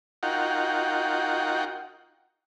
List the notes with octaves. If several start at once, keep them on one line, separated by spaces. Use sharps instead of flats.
D#4 F4 F#4 A#4 F#5 G5